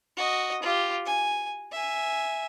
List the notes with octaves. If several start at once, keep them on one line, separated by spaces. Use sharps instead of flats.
F#4 D#5
F4 G4
G#5
E5 G#5